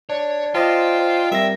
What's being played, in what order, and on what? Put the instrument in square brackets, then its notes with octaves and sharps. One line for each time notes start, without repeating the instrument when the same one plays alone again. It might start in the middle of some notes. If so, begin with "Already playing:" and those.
[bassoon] D4 [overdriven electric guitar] C#5
[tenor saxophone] F4 [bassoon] C5 [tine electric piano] D5 D#5 A5 [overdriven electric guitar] G5
[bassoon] C5
[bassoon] A#2 [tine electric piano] G3 C4 A#6 [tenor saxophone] E5